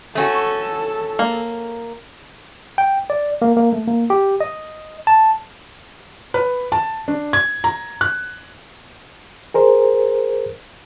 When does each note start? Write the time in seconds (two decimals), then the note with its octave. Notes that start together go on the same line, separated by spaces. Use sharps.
0.15 A3 C#4 F#4 A4
1.19 A#3
2.78 G5
3.10 D5
3.42 A#3
3.56 A#3
3.73 A3
3.88 A#3
4.10 G4
4.40 D#5
5.07 A5
6.34 B4
6.72 A5
7.08 D4
7.33 G#6
7.64 A#5
8.01 F#6
9.54 G#4 A#4 C5